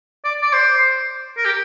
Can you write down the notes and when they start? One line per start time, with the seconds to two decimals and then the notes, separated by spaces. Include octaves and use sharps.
0.25 D5
0.42 D5
0.53 C5
1.37 A#4
1.45 G4